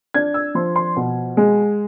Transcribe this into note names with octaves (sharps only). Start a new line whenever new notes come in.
D4 G#6
E6
F3 C6
C6
B2
G#3